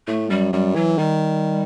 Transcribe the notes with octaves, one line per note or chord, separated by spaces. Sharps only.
A2 A3
F#2 G3
F#2 G3
E3 F#3
D#3 G3